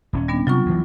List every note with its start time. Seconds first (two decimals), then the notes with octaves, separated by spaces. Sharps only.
0.13 D#1 C4 C#4
0.28 G3 B3 D4
0.47 C3 F#3 F4 C#6
0.66 D2 E3